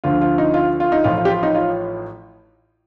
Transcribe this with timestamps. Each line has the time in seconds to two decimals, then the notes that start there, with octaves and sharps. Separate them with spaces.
0.04 D2 D3 F3 F4
0.21 F4
0.38 D#4
0.54 F4
0.80 F4
0.92 D#4
1.04 A1 A2 F3 F4
1.17 F4
1.25 G4
1.30 F4
1.43 D#4
1.55 F4